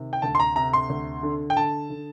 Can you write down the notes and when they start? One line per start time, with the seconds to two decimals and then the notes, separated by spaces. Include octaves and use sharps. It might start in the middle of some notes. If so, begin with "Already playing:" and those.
Already playing: C3 D#3
0.13 G5
0.22 D2 A5
0.35 C6
0.40 A#5
0.56 C3 A#5
0.73 C6
0.89 D2
1.23 D3
1.50 G5
1.56 D3 A5
1.90 D3